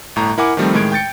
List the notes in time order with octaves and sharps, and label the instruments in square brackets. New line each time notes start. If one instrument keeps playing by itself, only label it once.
[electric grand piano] G1 A2 A#5
E4 A#4 F#5 G#5 D6
D#3 F3 G3 A3 C4
A2 D#3 G#3 G#6 D7
G5 G6 A6 C#7